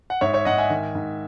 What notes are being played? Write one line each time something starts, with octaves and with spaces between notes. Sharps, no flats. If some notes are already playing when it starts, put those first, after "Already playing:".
F#5
G#2 C#5 E5
C#5 E5
G#2 D#5 F#5
E5 G#5
D#3
G#2